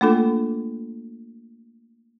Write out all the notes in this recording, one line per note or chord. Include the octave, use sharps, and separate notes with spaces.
A3 A#3 D4 F4 A4